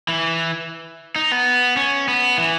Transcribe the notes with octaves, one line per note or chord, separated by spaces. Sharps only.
E3
D#4
B3
C#4
B3
E3